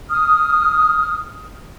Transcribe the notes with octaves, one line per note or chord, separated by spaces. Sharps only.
D#6 F6